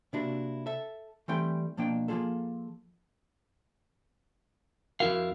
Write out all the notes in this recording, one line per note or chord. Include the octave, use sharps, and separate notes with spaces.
C3 A#3 D4 E4 F#4
A4 E5
E3 G3 A3 C4 E4 G5
B2 F3 A#3 D4 G5
F3 A#3 C4 F4 G#4 A4
F2 E4 F#4 A#4 F5